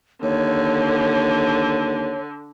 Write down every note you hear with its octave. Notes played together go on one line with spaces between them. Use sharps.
D#2 D3 C#5